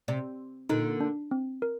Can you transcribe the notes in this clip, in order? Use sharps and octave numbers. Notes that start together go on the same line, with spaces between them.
C3 D5
A#2 D3 D#4
D4
C4
A#4